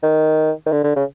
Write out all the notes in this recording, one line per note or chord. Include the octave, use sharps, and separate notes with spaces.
D#3
D#3
D3
D3
C#3